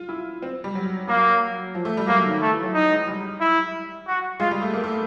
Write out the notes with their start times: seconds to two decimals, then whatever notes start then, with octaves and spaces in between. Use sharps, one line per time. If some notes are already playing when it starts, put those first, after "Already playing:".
Already playing: F4
0.09 E4
0.42 C4
0.64 G3
0.75 F#3
1.08 F#3 A#3
1.75 F3
1.85 A3
1.97 G3
2.08 F#3 A#3
2.24 D#3
2.41 A3
2.53 E3
2.63 F#3
2.74 D#4
2.91 G#3
3.07 G3
3.40 E4
4.07 F#4
4.40 G#3 F4
4.51 G3
4.62 A3
4.74 A#3
4.84 A3